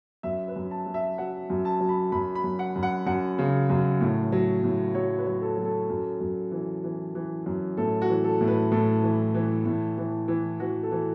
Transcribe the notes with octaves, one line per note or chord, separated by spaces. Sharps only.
F#2 E5
B4
F#2
A5
F#3
E5
F#3 F#5
F#2
A5
F#3
B5
F#2 B5
B5
F#2
F#5
F#2
F#5
F#2 F#5
C#3
F#2
A2
F#3
A2
F#3 C#5
B4
F#3
A4
F#3
A4
F#2
F#2
E3
E3
E3
F#2
A2 A4
F#4
E3
A4
A2
B4
A2 A4
E3
E3
A2
E3
E3
E3 F#4
A4
E3